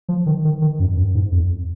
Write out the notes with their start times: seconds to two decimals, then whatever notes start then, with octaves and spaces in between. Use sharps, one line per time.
0.09 F3
0.26 D#3
0.45 D#3
0.62 D#3
0.80 F#2
0.97 F#2
1.14 G#2
1.32 F2